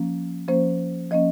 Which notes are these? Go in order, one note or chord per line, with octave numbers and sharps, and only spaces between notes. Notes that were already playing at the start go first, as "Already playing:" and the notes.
Already playing: F3 A#3 C#4
F3 A#3 C#4 C5
F3 A#3 C#4 D#5